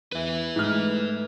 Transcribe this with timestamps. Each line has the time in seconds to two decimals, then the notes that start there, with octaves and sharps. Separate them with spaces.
0.12 E2 B4 E5
0.56 G#2 A3 F6